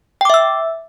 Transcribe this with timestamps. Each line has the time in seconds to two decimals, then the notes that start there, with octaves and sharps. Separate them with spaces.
0.21 G5
0.25 D6
0.30 E5
0.34 E6